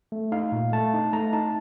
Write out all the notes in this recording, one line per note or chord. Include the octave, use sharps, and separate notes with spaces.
A3
D#4 F5
A#2
A3 A5
D#4
A3 A#5
D#4 A5